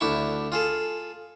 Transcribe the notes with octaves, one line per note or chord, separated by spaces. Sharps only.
D2 D4 E4 C#6
F4 G#4 A4